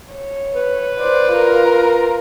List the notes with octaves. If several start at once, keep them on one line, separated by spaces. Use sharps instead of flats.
C#5
B4
C5 D5
F4 A#4